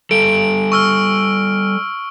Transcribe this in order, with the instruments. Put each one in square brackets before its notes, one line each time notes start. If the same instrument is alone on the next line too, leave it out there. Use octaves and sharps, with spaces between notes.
[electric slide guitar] G3 A4 [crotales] D7
[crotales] C#6 E6 F6